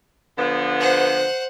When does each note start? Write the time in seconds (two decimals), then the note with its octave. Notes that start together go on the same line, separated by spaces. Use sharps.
0.38 D3 F3 B3
0.80 C5 F#5